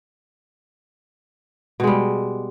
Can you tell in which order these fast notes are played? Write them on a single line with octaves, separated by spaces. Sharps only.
B2 G#3 G3